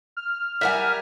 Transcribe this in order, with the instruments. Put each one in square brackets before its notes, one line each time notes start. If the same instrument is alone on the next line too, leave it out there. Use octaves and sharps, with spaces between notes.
[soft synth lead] F6
[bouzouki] G3 A#4 G#5 [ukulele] E5 F#5